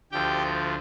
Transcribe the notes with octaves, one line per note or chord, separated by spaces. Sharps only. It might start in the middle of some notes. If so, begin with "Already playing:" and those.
D2 D3 F3 G4 G5